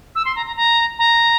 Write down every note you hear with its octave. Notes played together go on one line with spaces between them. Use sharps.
E6
C6
A#5
A#5
A#5
A#5